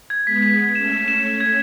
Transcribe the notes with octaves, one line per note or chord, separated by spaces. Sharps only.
G#6
G#3 B3 B6
B6
B6
A3 C#4 E7
E7
E7
E7
G#6